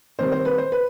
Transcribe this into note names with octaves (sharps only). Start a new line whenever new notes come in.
C3 D#3 G3 C5
C5
B4
C5
B4